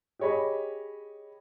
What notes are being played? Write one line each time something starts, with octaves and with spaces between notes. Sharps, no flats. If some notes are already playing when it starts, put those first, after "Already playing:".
G4 G#4 C#5 D#5 B5